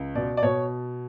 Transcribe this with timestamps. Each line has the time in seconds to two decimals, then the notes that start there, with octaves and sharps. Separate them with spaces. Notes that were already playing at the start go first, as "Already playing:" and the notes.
Already playing: C#2
0.15 B2 D5
0.37 D5
0.43 B2 C#5